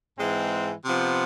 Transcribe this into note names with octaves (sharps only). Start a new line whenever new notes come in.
G#2 E3 G#3 C4
C3 F3 B3